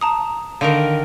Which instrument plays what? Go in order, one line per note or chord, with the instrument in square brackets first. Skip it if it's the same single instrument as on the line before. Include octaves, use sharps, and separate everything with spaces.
[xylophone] A5 A#5 D#6
[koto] D3 D#3 A#4 [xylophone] F5